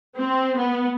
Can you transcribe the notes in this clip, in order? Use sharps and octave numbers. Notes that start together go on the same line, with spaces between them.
C4
B3